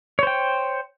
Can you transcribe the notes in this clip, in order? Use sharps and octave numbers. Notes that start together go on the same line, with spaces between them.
C5 C#5 G5